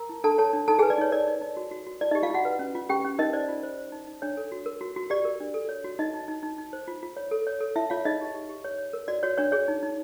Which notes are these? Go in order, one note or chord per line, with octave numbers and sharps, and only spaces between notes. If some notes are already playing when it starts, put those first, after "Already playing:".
Already playing: A#4 A#5
E4
D4 A4 A5
A4 C#5 A5
D4
D#4 A4 A5
G#4 B4 G#5
D5
D#4 C#5
A#4 D5
D#4
D#4
F#4
F#4
F#4
E4 D5
D#4 G4 D#5
F4 F5
E4 F#4 F#5
B4
C#4
F4
C#4 G4 G5
C#4
D#4 A#4 D#5
C5 D5
F4
C5
C5
D#4
D#4
D4 C#5
A4
F#4
A#4
F#4
F#4
G4 D5
A#4
D4
A4
C#5
F#4
D#4 D#5
D#4
D#4
D#4
D#4
C5
F4
F4
C#5
A4
C#5
A4
E4 E5
F4 C#5 F5
D#4 G#4 D#5
G4
G4
G4
C#5
C#5
A#4
F#4 D5
F#4 C#5
D4 C#5
G#4 C#5
D#4
D#4